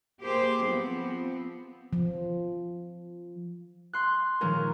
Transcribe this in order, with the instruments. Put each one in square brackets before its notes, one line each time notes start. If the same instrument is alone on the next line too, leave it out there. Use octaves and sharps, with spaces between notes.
[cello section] A#3 G4 G#4 C5
F3 B3 C4
[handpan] F3
[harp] C6 F#6
A#2 D#3 F3 G#3 C#4 A#4